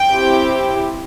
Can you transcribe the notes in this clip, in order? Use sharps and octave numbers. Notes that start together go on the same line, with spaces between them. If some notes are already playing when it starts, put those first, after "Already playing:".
Already playing: G5
C4 E4 G4